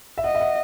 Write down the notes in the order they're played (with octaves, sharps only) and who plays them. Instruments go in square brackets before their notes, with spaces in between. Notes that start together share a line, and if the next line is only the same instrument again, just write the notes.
[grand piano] E5
[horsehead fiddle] D#5 [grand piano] F#5
[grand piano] E5
F#5